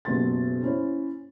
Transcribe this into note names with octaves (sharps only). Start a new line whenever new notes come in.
F#1 B2 F#3 G4 C6 A6
C#4 E4 C5 C#5